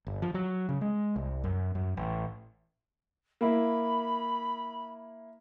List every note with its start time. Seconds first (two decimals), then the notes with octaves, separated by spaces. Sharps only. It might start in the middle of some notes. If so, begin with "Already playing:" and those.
0.07 G1
0.22 F3
0.34 F#3
0.69 C#3
0.81 G#3
1.16 C2
1.44 F#2
1.75 F#2
1.97 A1
3.41 A#3 E4 B5